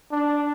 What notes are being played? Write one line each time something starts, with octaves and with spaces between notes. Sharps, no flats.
D4